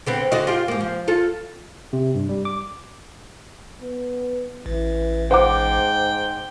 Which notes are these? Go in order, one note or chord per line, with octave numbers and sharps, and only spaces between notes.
D3 B3 C4
D3 F#4 D#5
F4 G4
G#2 A#3
F3
F4 A4
C3
G2
G3
D6
B3
A1 E3
G#2 C5 F#5 G5 D6